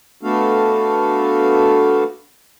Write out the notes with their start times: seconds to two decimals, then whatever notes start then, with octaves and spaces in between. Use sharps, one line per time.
0.23 A3 B3 D4 F#4 A4 F5